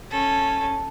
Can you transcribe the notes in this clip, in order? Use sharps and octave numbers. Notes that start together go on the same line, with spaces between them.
C#4 A4